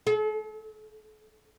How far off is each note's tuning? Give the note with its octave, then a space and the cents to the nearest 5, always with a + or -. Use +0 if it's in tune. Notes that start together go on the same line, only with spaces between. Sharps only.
A4 -40